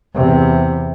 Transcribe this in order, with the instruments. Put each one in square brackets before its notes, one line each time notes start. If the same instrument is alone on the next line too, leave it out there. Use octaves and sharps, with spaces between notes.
[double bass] E2 C3